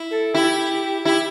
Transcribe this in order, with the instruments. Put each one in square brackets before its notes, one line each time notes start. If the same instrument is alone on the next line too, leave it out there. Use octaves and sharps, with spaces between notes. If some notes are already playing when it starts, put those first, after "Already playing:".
Already playing: [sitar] E4
[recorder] A4
[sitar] E4 [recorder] G4
[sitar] E4 [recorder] G4